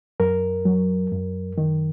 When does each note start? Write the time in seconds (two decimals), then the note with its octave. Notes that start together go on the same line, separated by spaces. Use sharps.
0.20 F#2 A#4
0.65 F#3
1.12 F#2
1.58 D#3